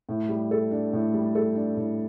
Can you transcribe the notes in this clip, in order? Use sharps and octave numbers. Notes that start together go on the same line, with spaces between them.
A2
G3
A4
D4
A2
G3
A4
D4
A2